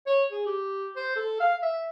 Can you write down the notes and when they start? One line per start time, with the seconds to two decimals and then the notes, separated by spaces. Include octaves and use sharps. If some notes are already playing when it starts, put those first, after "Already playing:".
0.07 C#5
0.31 G#4
0.46 G4
0.96 C5
1.16 A4
1.40 F5
1.62 E5